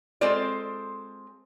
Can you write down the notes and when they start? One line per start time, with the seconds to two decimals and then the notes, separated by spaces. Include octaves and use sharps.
0.21 G#3 C4 F4 A4 C5 D5